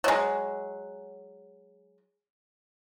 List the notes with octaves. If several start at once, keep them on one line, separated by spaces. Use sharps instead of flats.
F#3 G#3